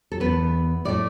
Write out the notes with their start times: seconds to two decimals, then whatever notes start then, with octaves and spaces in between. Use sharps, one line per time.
0.12 A4
0.20 E2 B2 B3 B4
0.85 A2 A3 D5